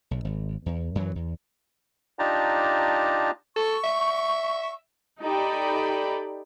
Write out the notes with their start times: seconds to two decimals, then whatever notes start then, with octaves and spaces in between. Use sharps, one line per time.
0.11 B1
0.25 G#1
0.66 E2
0.95 F#2 E3 F#3
1.15 E2
2.19 D4 D#4 F4 G4 A5 A#5
3.56 A4 C#6
3.84 E5
5.22 D#4 G4 A4 D5 G5 B5